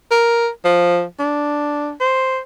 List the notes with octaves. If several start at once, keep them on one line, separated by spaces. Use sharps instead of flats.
A#4
F3
D4
C5